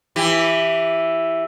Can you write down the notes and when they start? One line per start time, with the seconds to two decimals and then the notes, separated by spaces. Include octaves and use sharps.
0.16 E3 G4